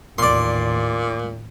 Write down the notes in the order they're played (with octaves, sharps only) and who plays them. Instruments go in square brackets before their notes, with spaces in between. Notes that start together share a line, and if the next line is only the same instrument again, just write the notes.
[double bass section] A1 D#2 [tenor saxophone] A#2 [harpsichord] D5 C6